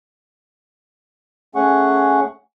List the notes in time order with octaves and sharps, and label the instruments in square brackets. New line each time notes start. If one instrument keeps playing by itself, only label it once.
[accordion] A3 C#4 G#4 F#5 C#6